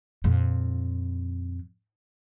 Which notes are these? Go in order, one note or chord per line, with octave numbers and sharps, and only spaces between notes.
F2 A#2